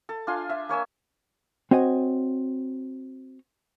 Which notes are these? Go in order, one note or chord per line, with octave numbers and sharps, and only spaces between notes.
A4
D4 F4 G#5 C6
E5
A#3 C#5 G#5 E6
C4 F#4 C#5 D#5 G#5